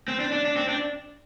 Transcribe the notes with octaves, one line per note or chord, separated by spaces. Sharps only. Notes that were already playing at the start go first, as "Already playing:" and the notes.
C4
D4
D4
D4
C4
D4